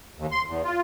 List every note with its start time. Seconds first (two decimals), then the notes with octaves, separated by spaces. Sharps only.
0.18 D#2
0.31 C6
0.47 E2
0.64 F4